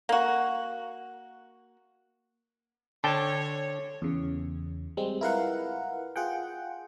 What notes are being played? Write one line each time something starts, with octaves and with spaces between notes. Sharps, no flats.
A#3 F#4
D3 C#5 G5 A5
E2 C#3
G3 G#3 C4
E4 F4 A#4 B4 F5 F#5
F4 G#4 F#5 G5